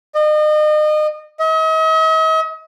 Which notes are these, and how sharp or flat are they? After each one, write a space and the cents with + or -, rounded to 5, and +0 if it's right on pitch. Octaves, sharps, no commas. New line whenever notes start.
D#5 -35
D#5 +45